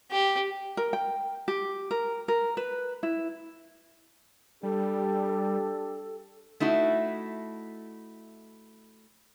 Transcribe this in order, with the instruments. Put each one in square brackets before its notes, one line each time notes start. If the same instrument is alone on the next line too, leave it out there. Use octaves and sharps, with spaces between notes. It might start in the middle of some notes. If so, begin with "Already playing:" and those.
[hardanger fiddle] G4
[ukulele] A#4
G5
G4
A#4
A#4
B4
E4
[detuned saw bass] G3 [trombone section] D4 G4 [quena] A4
[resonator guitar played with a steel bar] A3 D#4 E4 F#4